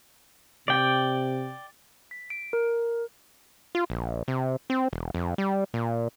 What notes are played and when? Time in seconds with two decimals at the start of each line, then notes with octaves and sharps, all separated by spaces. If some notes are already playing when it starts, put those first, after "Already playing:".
0.68 C3 D5 G5
2.11 B6
2.30 D7
2.53 A#4
3.75 F4
3.90 A#1
4.28 C3
4.70 C4
4.93 E1
5.14 F2
5.38 G3
5.74 A#2